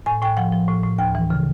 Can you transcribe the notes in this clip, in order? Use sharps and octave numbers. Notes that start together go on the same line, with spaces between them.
A2 G#5
A2 G5
F3 F#5
F3
A2
A2
D2 G5
E3
C#3